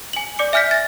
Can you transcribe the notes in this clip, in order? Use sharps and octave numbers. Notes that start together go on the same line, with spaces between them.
G#5 F#7
D5 D6 C#7
E5 G#5 F6 G6 B6
A6 A#6